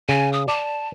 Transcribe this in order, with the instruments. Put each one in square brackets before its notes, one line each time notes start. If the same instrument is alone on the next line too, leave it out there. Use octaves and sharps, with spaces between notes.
[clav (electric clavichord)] C#3 [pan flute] G#5
[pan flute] D#6
[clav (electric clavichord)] D5 [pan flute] A5